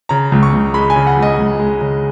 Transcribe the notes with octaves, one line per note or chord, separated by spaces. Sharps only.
C#3 A#5
C#2
C#6
C#2
G#3 B5
G#5
C#3
F#5
C#2
D#5
C#2
G#3
C#3